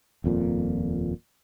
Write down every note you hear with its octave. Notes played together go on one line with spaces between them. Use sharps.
D#1 F2 A#2